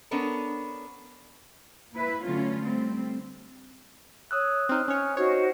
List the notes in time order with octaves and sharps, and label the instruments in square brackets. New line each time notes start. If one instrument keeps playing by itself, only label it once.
[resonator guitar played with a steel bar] B3 C#4 D4 A4 A#4
[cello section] A#3 E4 B4
D3 F#3 A3 C#4 F4
G3 A3 C4
[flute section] C#5 [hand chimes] D#6 E6 F#6
[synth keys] C4 D#4 [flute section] F6
[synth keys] C#4 C#5 [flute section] G5 G#5 F6
[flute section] D#4 F#4 C5 [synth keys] C#5